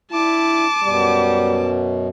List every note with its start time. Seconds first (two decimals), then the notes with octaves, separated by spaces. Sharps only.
0.12 D4 E4 A5 D6
0.84 F#2 B2 G3